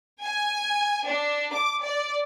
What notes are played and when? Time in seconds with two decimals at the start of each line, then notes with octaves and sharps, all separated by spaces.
0.20 G#5
1.05 D4
1.52 D6
1.83 D5